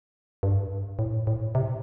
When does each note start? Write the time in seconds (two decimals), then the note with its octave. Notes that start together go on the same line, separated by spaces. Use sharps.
0.43 G2
0.99 A2
1.27 A2
1.55 C3